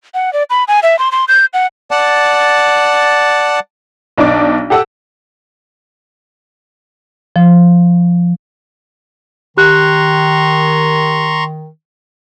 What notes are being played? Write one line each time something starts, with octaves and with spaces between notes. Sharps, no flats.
F#5
D5
B5
G#5
E5
C6
C6
G6
F#5
D5 F#5 A5
B1 D4 D#4 D5 D6
G4 A4 F#5 A5 E6
F3
D#3 G4 A#5 C6 C#6 F#6